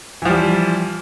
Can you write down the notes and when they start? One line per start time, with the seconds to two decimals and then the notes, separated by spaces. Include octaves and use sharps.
0.22 E3
0.25 F3
0.29 G3